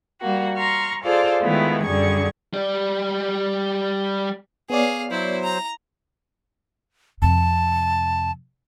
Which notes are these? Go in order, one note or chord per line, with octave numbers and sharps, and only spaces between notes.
G3 A#3 F#4
A#5 C6 C#6 F6
F4 G#4 A4 C5 D5 F5
D#3 G#3 A3 B3 E4 F4
F#2 D3 G3 G#4 C#6 G#6
G3 D5
B3 G#4 C#5 D5 F5
F#3 E4 C5
A#5
F2 C3 A5